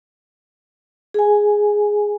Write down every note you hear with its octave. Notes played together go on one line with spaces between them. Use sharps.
G#4 G#5